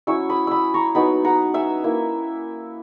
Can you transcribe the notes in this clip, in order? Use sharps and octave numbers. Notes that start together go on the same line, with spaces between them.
F#3 C#4 E4 C#6 E6
B5 D#6
B5 D#6 E6
A#5 C#6
F#3 B3 D#4 G#5 B5
F#5 A#5
E5 G#5
A#3 E4